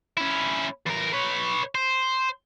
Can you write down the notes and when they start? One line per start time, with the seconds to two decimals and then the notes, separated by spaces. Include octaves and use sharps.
0.17 C#4 E4
0.87 E2 A#4
1.13 B4 C#5
1.75 C5